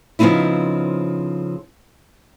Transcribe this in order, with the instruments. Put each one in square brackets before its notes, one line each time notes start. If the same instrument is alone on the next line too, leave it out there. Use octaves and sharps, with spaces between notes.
[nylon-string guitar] C#3 F3 B3 C4 D#4 E4